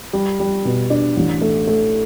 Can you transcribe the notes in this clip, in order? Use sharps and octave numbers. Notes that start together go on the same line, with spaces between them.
G3
G3
B2
D4
A1
A3
A3